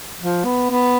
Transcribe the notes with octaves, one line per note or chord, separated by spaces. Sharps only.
F3
B3
B3